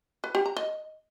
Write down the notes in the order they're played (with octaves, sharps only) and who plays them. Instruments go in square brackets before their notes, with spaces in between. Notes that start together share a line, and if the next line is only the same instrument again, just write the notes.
[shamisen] B4
G4
A#5
D#5